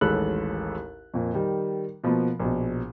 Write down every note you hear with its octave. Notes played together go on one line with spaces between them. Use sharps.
A1 D#2 G#3 A4 B5 F#6
F2 A#2
D#3 G3
B2 F3 A#3 B3
A#1 B2